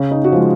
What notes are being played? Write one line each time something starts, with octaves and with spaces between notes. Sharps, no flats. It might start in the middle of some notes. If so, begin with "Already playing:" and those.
Already playing: C#3
D#4
F#4
F3 G#3 F4